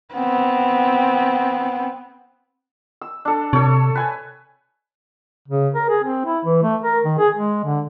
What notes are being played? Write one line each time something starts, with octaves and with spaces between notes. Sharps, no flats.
B3 C4
E6
D4 A4
C3 A4 C#5
B4 G#5
C#3
A#4
G#4
C4
E4
E3
A3
A#4
D#3
G#4
G#3
D3